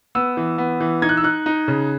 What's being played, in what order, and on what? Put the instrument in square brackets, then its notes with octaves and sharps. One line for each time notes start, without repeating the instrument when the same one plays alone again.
[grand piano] B3 E6
E3
B3
E3
D#4 G#6
F#6
E6
D#4 F#6
D#4
C#3